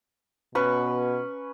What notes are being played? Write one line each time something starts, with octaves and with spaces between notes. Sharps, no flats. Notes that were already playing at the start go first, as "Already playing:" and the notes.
B2 C#4 B4 C#6